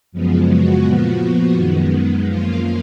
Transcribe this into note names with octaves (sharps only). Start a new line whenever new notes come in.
F#2 C#3 F3 G#3 B3
F#4
A#2 F3 B3
F#2 D#3 G#3 B3
F#2 F3 A#3 F4